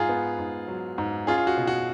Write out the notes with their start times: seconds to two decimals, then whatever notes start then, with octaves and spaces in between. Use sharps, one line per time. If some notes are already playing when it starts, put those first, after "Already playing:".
Already playing: G#2 F4 G#4
0.09 B3
0.39 G#2
0.67 F#3
0.98 G#2
1.27 C#4 F4 G#4
1.38 F4
1.47 F#4
1.57 B2
1.67 F#4